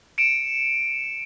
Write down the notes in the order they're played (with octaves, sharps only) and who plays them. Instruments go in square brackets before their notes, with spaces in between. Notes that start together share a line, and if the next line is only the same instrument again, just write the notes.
[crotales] C#7 D7 E7